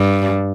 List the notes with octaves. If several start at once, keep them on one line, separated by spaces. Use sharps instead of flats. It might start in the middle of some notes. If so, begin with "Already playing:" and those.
Already playing: G2